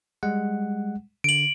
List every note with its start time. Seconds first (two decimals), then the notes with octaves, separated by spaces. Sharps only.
0.23 G3 G#3 F#5
1.24 D3 D7 F#7